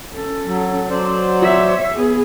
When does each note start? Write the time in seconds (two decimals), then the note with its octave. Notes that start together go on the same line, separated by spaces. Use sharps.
0.14 C#4 A4
0.46 F#3
0.90 F#3 C5 D5
1.40 C#5 E5
1.94 B3 G#4